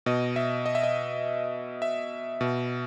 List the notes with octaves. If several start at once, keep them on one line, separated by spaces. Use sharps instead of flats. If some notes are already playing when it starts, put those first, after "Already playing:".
B2 D#5
E5
D#5
E5
D#5
E5
B2